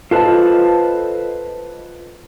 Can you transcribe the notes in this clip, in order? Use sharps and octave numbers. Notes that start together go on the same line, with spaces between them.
F4 A4 B4 C5 D#5 A5